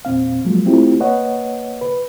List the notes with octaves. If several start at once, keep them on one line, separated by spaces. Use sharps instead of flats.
E2 A#2 C4 F5
F3 F#3 G#3 A#3
A3 C4 E4 F4 G4
A#3 B4 C#5 D#5 F#5
B4